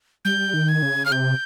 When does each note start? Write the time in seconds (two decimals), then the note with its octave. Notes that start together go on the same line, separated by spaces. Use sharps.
0.25 G3 G6
0.54 D#3
0.68 G#6
0.82 C#3
1.06 F6
1.11 C3 G6